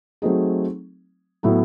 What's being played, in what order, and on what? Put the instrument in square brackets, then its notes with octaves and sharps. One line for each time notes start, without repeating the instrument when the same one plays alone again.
[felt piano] F#3 A3 C4 D#4 G#4
A2 F#3 B3 E4 A4